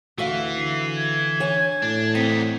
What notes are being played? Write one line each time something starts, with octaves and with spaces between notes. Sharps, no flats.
D2 E3 F#4 E5 F5
D3 C7
G#6
C#5 G#5
A2 D4
E2 C4 D#4 B6